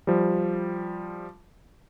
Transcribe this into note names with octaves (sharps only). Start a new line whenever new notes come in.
F3 G3